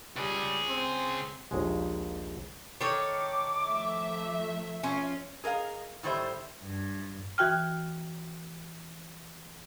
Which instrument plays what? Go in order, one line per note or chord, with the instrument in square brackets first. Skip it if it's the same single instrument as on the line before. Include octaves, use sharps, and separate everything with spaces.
[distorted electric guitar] C#2 G#4 [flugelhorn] G3
[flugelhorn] C4
[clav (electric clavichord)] A#1 D#2 G#3
[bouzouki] D#3 A4 C#5 [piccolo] D6
[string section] F3 A3 E5
[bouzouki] C#4 F4
[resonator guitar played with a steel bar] G#4 A#4 D#5 F5
A2 D#3 G3 C5 E5
[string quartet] G2
[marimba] E3 F#4 G5 F6